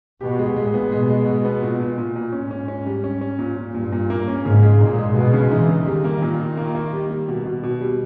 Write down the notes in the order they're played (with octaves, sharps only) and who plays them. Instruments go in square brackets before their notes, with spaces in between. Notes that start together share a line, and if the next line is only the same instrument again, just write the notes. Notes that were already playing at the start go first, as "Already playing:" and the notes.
[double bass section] B2 [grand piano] G4
[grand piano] G#3
[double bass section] A#2 [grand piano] G#3
[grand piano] B3
[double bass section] B2 [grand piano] G#3
[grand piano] G#3
G#3
B3
A#2
A#2
A#2
A#2
[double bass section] G#2 [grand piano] C#4
[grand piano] C#4
C#4
G3
C#4
C#4
A#2
A#2
[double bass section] G2 [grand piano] A#2
[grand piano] A#2
A#3
C#4
[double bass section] G#2 [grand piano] C#3
[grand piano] G#3
[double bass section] A#2 [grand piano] D#4
[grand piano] G#3
[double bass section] B2 [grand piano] G#3
[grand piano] C#3
[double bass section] E3 [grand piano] D#4
[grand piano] C#3
[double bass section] D#3 [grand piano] G3
[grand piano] A#3
A#2
A#2
A#3
A#3
G3
G3
B2
B2
B2
G3